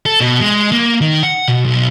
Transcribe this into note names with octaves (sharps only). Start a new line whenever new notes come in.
A4
B2
G#3
A#3
D#3
F#5
B2
B1